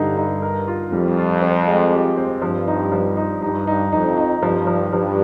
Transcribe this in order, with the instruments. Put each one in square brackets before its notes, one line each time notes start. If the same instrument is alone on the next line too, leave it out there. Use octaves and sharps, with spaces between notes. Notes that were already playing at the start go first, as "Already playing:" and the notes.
Already playing: [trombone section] G2 [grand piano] D3 D#4
[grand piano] D#4
A#4
F4
[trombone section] F2 [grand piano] G3
[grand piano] F4
C4
G#3
G4
C4
[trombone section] G2 [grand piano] F3
[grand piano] D#4
F3
D#4
[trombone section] G2 [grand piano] D#4
[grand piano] D#4
[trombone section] F2 [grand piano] D#4
[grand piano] D#4
[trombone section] G2 [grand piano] F3
[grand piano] F3
[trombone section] G2 [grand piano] F3